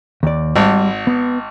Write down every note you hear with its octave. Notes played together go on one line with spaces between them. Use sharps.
D#2 D5
G#1 G3
B3